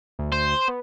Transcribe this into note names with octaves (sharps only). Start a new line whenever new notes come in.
D2
C5
B3